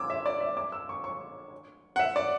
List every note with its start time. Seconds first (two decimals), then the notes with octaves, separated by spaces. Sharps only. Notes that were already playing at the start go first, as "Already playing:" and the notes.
Already playing: D6 E6
0.10 E5
0.26 D5
0.41 E5
0.57 D6
0.72 E6
0.89 C#6
1.04 C#6
1.96 F#5
1.99 E5
2.16 D5